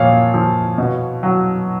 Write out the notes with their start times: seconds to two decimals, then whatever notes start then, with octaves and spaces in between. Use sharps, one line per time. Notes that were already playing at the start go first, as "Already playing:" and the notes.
Already playing: A#2 F3 C#5 F5
0.34 F3
0.78 B2
1.23 F#3